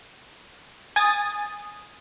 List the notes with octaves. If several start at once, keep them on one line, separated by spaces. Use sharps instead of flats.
G#5 D#6 A6